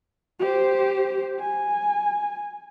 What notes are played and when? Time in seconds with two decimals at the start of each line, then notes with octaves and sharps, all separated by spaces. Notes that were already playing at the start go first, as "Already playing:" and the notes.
0.39 G4 C5
1.40 G#5